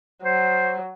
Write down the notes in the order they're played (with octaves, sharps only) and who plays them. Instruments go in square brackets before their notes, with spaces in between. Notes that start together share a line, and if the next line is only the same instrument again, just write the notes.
[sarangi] F#3 [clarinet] C5